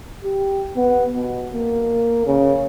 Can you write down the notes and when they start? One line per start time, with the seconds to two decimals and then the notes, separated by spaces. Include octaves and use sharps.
0.24 G4
0.76 B3
1.15 B2
1.54 A#3
2.26 C#3